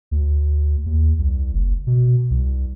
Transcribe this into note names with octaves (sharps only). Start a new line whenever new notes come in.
D2
D#2
C2
F#1
B2
C2